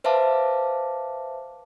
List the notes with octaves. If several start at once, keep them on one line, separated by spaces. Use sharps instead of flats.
B4 C5 E5 F5 A5 D6